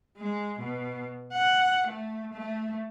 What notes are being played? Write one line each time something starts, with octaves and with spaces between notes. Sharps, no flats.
G#3
B2
F#5
A3
A3